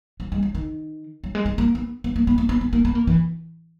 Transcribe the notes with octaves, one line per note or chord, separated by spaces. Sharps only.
F#3
G#3
F#3
D#3
F#3
G#3
G#3
A#3
B3
B3
A#3
B3
A#3
B3
B3
A#3
B3
A#3
E3